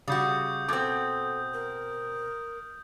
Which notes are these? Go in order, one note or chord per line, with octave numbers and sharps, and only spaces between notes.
C#3 G3 F#4 D#6 G6
B2 C4 A4 D6 G#6
A#4